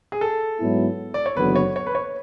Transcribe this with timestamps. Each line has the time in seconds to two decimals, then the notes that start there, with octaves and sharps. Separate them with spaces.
0.12 G#4
0.21 A4
0.60 G#2 F#3 B3 E4
1.14 D5
1.26 C#5
1.37 F#1 E2 D3 F#3 B3 B4
1.56 C#5
1.76 C#5
1.87 B4
1.95 C#5